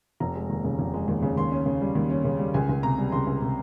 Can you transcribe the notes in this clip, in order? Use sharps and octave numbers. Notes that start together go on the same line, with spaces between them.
F1 A#5
G#3
D#2
C#3
F1
G#3
D#2
C#3
D#2 C6
C#4
C#3
G3
D#2
C#4
C#3
G3
C#2 G#5
C#2
C3 A#5
G3
C#2 C6
C#2
C3